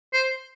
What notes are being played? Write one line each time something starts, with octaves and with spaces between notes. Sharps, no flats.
C5